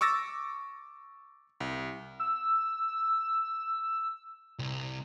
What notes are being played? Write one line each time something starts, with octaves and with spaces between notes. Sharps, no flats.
C#6 D6 E6 A6 A#6
C2
E6
C2